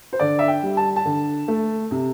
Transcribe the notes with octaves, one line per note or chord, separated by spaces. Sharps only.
C5
D3 D5
E5
G5
G3
A5
A5
D3
A3
C3